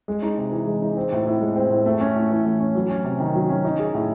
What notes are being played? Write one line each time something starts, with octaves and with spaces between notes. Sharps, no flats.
G#3
D#4
C3
E3
G#3
D#4
C4
A2
A2
G#3
C4
A2
A3
C#4
A2
E3
A3
C#4
F#3
C#4
C3
D#3
F#3
C#4
D#4
G#4
A2